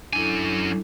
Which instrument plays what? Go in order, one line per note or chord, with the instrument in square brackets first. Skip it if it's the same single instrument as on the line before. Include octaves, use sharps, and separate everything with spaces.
[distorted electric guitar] F#2 G#5 [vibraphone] D4 E4 A4